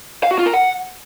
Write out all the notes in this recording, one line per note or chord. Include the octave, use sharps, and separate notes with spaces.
F5
F#4
F4
A#4
F#5